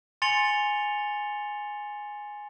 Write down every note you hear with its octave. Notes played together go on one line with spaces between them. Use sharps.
G#5 C6 A6 C#7 F7 G7